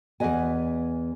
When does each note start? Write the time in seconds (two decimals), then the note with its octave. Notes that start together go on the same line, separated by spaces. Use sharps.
0.20 E2 C#3 B4 D#5 G#5